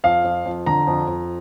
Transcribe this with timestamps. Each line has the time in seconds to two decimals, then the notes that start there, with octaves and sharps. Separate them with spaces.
0.04 F2 F5
0.24 F2
0.45 F2
0.66 D3 A#5
0.87 F2
1.08 F2